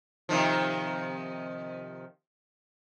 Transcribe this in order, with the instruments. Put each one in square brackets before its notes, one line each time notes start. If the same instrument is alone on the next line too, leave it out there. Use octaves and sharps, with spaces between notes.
[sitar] C3 D#3 F3